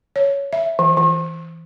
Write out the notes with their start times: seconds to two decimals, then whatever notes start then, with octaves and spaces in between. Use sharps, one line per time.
0.16 C#5
0.53 E5
0.79 E3
0.97 E3